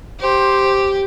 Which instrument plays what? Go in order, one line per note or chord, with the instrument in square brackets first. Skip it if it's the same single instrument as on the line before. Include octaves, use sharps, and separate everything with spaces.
[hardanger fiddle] G4 [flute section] C5